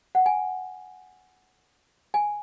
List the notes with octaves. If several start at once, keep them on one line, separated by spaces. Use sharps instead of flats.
F#5
G#5
G#5